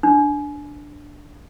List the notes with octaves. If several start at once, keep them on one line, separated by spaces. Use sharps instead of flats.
D4